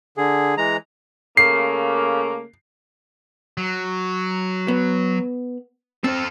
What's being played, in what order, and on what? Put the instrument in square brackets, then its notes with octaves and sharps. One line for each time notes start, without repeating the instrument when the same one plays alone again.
[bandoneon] D3 G#4
E3 G#3 A#5
[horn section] C#3 A3 A#3 [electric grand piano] C7
[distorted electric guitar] F#3
[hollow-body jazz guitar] B3
[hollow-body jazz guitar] C4 [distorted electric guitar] F4 A4